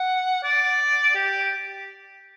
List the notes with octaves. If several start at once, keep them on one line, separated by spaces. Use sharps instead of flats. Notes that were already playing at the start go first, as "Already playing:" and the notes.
Already playing: F#5
D5
G4